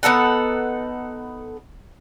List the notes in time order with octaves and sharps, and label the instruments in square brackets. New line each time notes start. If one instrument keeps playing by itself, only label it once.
[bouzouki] B3 D#4 A4 F#5